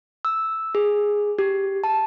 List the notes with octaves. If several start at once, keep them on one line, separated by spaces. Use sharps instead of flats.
E6
G#4
G4
A5